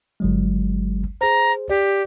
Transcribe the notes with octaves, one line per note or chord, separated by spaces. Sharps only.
G1 F#3 G#3
G#4 C5 A#5
G4 D5